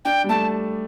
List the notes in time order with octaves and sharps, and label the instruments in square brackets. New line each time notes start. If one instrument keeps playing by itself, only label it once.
[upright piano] D4 [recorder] G5
[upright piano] G3
[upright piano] A3 [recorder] A5